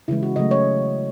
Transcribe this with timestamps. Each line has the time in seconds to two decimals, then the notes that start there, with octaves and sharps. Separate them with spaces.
0.08 C#3 E3 G#3 E4
0.23 F#4
0.36 C#3 F#3 A3 D#5
0.51 C#5